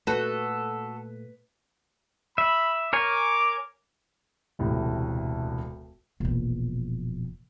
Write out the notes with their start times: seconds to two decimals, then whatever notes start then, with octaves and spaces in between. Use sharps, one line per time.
0.07 A#2 A3 F#4 A4 B4
2.38 E5 B5
2.93 A#4 C#5 G#5 D6
4.59 E1 D2 A2 C3
6.20 E1 A#1